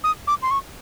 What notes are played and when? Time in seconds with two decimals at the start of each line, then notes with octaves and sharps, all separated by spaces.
0.04 D#6
0.27 D6
0.42 C6
0.51 C#6